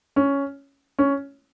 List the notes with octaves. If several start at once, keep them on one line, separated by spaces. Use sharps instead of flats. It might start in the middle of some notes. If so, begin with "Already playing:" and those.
C#4
C#4